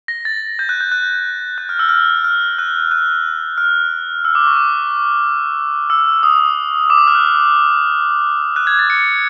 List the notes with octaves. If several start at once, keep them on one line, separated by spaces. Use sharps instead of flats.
A#6
A6
G6
F#6
G6
F#6
F#6
F6
E6
F6
F6
F#6
F#6
F6
E6
D6
C#6
D6
E6
D#6
D6
D#6
F6
F#6
F#6
G#6
A6
C#7